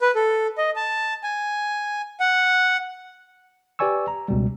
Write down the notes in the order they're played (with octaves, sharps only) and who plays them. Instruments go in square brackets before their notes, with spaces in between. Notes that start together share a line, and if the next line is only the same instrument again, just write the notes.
[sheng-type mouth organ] B4
A4
D#5
A5
G#5
F#5
[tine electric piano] G4 B4 D5 G#5 C#6 E6
A#5
C#2 B2 G3